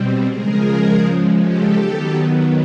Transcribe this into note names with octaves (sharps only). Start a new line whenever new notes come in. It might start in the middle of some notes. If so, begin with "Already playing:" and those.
Already playing: B2 G3 C4
C#3 F3 G#3 G#4 A#4
G4 A4
D#3 F#3 B3